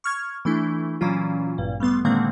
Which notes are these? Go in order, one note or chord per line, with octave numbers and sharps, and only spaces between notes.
C#6 F6 G#6
E3 A3 D4 E4
A#2 E3 F#3 C#4 F4
A1 G2 A#2
G3 A3 B3 C6
A#2 D3 D#3 G#3 A#3 C4